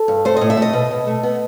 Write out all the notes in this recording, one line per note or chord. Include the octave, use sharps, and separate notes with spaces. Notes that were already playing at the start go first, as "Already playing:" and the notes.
Already playing: A4
G2
A3 C5
A2 D#5
E5
A3 D#5
B2
B2
A3
B3